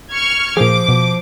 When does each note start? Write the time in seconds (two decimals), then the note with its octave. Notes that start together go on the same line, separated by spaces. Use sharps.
0.13 C#6 F6 G#6
0.57 A#2 F3 G#4 C5 D6
0.89 B2